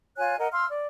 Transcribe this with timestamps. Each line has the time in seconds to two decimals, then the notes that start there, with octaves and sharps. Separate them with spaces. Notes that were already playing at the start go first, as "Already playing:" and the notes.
0.18 F4 C#5 G#5 F#6
0.38 A#4 D#5 F#5
0.52 F5 C6 E6 F6
0.68 D5